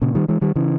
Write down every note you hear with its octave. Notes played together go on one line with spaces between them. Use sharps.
A#2 C#3
D#3 G3
E3 G#3
D#3 G3
C#3 E3